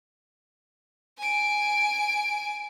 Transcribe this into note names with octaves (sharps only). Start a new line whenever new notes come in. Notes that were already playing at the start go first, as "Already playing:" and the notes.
G#5 D7